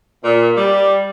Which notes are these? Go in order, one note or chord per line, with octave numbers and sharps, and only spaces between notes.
A#2
G3